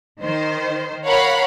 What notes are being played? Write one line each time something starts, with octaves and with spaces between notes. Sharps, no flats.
D#3 C5
A#4 C#5 F5 F#5 B5